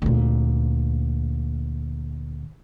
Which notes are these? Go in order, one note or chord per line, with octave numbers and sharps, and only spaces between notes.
D2 A#2